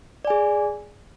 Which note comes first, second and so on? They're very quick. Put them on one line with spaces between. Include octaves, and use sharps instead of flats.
D5 G#5 G#4